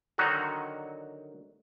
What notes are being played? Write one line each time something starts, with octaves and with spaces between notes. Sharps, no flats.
D3 D#3 F#3 D#4 F#4